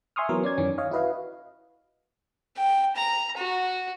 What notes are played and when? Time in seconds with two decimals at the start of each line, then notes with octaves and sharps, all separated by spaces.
0.16 E5 G#5 C6 C#6 D#6 F6
0.29 E3 F#3 B3 A#4
0.43 C#4 D5 G#6
0.58 F#2 D#3 E3 C#4
0.78 C#5 D#5 F5
0.91 E4 F#4 B4 D#5 F5
2.56 G5
2.96 A#5
3.37 F#4